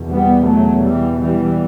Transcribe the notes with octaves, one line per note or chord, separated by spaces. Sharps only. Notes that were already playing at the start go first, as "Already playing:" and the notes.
Already playing: E2 B2
G3 B3
F#3 A3
E3 G3
E3 G3